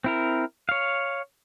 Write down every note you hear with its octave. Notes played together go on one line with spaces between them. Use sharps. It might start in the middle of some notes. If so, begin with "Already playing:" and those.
C4 E4 A#4
C#5 F5